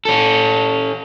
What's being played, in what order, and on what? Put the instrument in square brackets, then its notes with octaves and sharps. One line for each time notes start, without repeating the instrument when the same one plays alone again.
[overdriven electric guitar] C#4 A4